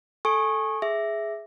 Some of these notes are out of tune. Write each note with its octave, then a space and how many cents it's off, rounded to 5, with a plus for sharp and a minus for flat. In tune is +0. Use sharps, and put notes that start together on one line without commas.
A4 -5 G#5 +10 C#6 -20
G#4 +5 E5 +0